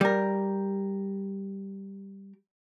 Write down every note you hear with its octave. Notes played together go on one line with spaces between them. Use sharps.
G3 A#4